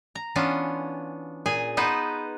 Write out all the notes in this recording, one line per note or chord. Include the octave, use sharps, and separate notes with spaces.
A#5
E3 B3 C#4 D4 F4
A#2 G#4 G#5
B3 D#4 B4 C5